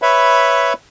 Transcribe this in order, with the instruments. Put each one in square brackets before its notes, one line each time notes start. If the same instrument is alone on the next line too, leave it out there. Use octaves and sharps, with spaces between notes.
[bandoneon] B4 C#5 E5 B5